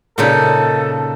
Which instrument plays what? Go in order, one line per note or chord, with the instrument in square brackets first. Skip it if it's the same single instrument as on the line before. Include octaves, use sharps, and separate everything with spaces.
[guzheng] A#2 C#3 D#4 [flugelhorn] A4